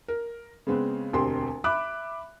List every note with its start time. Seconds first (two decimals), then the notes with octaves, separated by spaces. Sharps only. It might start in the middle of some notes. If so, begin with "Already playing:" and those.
0.08 A#4
0.67 C#3 G#3 B3 C4
1.13 E1 D2 C4 G4 C6
1.64 E5 B5 D6 F#6